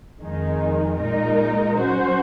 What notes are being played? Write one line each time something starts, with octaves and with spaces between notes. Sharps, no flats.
F2 D#3 G#3 D#4
A#2 G#3 D#4 A#4
F#3 C#4 F#4 C5